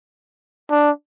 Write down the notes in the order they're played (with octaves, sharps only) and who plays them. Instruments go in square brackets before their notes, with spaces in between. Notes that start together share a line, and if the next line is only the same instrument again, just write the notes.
[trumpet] D4